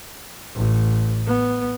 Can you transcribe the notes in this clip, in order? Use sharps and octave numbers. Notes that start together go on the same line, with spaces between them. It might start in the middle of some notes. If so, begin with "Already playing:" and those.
A1
B3